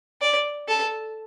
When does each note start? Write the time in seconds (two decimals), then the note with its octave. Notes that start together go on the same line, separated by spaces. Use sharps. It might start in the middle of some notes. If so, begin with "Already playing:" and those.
0.21 D5
0.68 A4